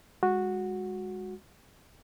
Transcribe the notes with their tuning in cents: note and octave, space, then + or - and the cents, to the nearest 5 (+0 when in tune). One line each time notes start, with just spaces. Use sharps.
G#3 -20 F#4 -10